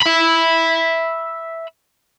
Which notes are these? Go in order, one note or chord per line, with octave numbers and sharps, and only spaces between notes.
E5 B5